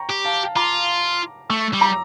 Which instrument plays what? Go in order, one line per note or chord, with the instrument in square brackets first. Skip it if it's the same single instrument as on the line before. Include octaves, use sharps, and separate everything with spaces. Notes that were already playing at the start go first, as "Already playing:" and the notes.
Already playing: [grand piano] G5 A#5 C#6
[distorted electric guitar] G4
[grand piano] F5 A5
[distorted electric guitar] F4 [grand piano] A#5 D6
[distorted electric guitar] A3 [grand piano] C#6 E6
[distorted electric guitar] G3
[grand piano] A#5 D6